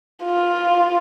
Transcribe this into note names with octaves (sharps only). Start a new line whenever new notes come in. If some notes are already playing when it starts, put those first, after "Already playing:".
F4